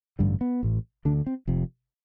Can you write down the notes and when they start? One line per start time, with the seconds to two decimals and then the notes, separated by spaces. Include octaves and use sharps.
0.19 A1 G2 D3 G3
0.41 B3
0.63 A1 A2
1.05 D2 D3 D4
1.26 C4
1.47 F1 F2 C3